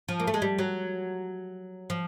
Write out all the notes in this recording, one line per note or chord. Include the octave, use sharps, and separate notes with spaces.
F3
A#3
A3
G#3
G3
F#3
F3